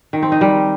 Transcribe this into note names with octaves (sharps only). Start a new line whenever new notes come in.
D#3
C4
D#4
G3